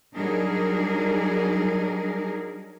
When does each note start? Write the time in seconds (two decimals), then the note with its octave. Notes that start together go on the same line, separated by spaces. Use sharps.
0.15 F#3 G3 D4 D#4 G#4 A#4